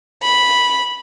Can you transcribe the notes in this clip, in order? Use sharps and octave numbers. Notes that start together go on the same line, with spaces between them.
B5